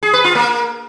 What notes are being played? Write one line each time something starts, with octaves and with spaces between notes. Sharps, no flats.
G#4
B4
F4
A#3